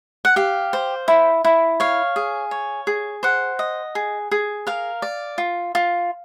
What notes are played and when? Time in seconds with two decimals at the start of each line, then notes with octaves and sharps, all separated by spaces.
0.25 F#5
0.36 G4 F5
0.73 C5
1.08 E4
1.44 E4
1.80 C#5 F5
2.16 G#4
2.51 C#5
2.87 G#4
3.23 C5 F#5
3.59 D#5
3.95 G#4
4.31 G#4
4.67 A#4 F5
5.02 D5
5.38 F4
5.75 F4